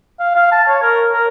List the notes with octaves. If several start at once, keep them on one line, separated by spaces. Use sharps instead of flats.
F5
F5
A5
C#5
A#4
A#4